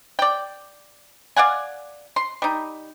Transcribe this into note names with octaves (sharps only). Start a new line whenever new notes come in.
D5 G5
D5 F5 F#5 G#5
C6
G3 D#4